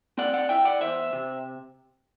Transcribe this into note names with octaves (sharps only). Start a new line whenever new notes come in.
C4 D5 F#5
D5 F#5
E4 E5 G5
D5 F#5
E2 C5 E5
C3